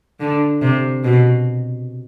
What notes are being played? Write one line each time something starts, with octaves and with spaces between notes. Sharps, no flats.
D3
C3
B2